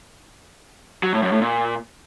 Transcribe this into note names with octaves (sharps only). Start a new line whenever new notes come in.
F#3
A2
F#2
A2
A#2